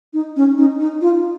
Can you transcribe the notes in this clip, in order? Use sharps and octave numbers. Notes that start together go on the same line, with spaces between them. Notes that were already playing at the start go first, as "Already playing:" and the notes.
D#4
C#4
D#4
D#4
F4